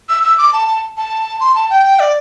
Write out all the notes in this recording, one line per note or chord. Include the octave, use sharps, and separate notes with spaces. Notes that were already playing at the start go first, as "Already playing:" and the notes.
E6
E6
D6
A5
A5
C6
A5
G5
D5